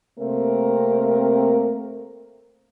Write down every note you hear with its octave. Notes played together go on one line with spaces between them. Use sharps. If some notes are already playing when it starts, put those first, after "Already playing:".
C3 A3 A#3 C4 A#4